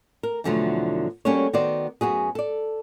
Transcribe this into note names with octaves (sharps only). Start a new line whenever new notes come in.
A#4
E2 B2 D3 F3 F#3 A3
G3 A#3 C#4 F#4 A4 C#5
D#3 B3 F#4 C5 D5
F#2 B3 F#4 G#4
A4 D5